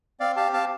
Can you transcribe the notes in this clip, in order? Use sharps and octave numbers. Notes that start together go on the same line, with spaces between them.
C4 D5 F5
G4 F5 A5
C4 F5 A5